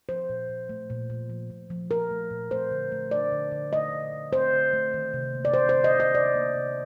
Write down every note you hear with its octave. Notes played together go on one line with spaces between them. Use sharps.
F3 C5
A#2
A#2
A3
A#2
A#2
F3
A#2
F3
F3 A#4
A3
A#2
A3 C5
D3
A3
A3 D5
D3
D3
A3 D#5
D3
D3
A3 C5
D3
A3
D#3
C3
A#3
D5
C3 C5
C5
D#3
D#5
C3
D#5
C3 D5
A#3
C3